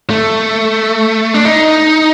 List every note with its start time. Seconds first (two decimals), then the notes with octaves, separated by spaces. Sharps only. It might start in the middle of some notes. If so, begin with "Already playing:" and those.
0.10 A3
1.34 D4
1.45 D#4